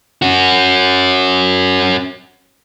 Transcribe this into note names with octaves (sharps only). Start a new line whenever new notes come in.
C#4 F#4